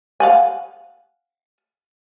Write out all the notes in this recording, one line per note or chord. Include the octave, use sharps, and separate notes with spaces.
F5 F#5 G#5